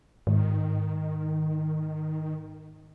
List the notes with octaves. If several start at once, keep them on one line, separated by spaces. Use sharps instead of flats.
G#2 D#3